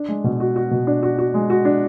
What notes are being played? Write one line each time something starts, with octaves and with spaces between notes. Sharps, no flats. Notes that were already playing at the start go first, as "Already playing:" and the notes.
Already playing: D4
G#3
B2
F#4
F#4
B2
D4
F#4
F#4
G#3
F#4
D4